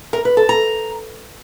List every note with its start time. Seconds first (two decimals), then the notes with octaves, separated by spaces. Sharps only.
0.13 A#4
0.25 B4
0.37 A4
0.49 A#5